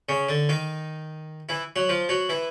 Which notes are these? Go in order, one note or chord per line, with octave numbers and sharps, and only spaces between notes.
C#3 C#4
D3 D4
D#3 D#4
E3 E4
F#3 F#4
F3 F4
F#3 F#4
E3 E4